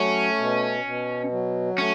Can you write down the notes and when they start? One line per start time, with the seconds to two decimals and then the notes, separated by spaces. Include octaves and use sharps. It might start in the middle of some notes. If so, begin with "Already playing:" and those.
Already playing: F#3 A3 C#4
0.38 B2
0.84 B2
1.31 F#3
1.78 A3 C#4